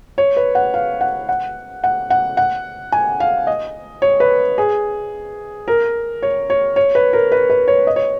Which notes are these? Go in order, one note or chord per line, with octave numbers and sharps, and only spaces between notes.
C#5
B4
F#5
F5
F#5
F#5
F#5
F#5
F#5
G#5
F5
D#5
C#5
B4
G#4
A#4
C#5
C#5
C#5
B4
A#4
B4
B4
C#5
D#5
C#5